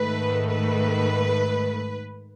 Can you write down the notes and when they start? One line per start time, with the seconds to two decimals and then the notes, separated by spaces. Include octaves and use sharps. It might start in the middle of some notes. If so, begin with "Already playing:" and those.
Already playing: G#2 D#3 A3 B4
0.48 B4